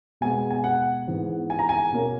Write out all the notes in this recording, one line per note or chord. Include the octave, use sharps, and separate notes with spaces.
B2 G#3 B3 G#5
G#5
F#5
G#2 E3 B3
G#5
A#5
G#5
B2 A#3 C#4